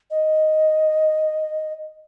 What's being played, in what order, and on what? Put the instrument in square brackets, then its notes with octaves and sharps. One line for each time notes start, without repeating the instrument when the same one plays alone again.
[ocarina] D#5